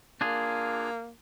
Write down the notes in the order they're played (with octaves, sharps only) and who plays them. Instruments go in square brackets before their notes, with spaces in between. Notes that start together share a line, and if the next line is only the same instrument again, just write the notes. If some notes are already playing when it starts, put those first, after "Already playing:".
[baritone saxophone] A#3 [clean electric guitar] D4 F4 G#4